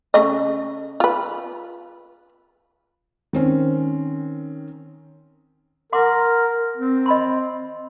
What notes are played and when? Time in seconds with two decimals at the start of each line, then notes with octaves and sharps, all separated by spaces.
0.14 C#3 A3 D#5
1.00 F4 B4
3.33 D#3 C4 C#4
5.93 A#4 F#5 C6 D6
6.77 C4
7.06 D#5 B5 C6